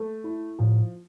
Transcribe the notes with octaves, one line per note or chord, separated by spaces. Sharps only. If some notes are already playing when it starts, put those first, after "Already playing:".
Already playing: A3
E4
A2 F3